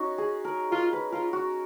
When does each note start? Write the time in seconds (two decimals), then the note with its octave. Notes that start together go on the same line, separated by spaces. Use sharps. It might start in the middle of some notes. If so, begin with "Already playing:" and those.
Already playing: C#4 D#4 F#4
0.18 G#4
0.45 A#4
0.71 F4 A#4
0.93 B4
1.12 F4 A#4
1.33 F#4